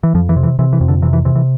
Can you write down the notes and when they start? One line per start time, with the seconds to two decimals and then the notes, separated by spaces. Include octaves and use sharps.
0.03 E3
0.14 F2 F3
0.29 E3
0.36 C3
0.43 E3
0.59 C3 E3
0.73 E3
0.81 F2
0.88 D3
1.02 C3 E3
1.13 E3
1.25 C3 E3
1.35 E3